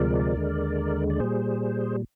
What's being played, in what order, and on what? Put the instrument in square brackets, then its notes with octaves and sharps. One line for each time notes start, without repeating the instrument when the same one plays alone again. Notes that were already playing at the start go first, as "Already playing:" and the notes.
Already playing: [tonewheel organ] D2 C3 F3 G#3 A#4 D5
D#2 D3 G#3
D5
A#2 G3 G#4 C5